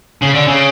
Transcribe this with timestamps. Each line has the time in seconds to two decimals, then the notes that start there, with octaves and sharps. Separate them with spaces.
0.22 C#3
0.35 D3
0.47 C#3